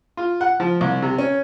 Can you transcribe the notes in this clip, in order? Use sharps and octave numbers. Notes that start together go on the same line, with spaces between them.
F4
F#5
F3
C2
C3
C#4